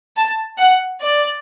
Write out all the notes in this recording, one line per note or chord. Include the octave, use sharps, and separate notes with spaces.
A5
F#5
D5